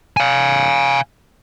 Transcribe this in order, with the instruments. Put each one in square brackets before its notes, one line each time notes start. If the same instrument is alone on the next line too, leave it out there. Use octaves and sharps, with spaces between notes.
[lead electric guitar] F5 G#5